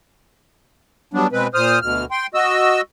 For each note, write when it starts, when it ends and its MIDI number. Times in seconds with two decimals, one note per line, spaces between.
1.14 1.27 54
1.14 1.27 55
1.14 1.27 59
1.14 1.27 62
1.32 1.47 47
1.32 1.47 56
1.32 1.47 60
1.32 1.47 71
1.54 1.79 46
1.54 1.79 72
1.54 1.79 87
1.54 1.79 89
1.82 2.05 38
1.82 2.05 47
1.82 2.05 89
2.11 2.27 79
2.11 2.27 84
2.34 2.81 66
2.34 2.81 75
2.34 2.81 88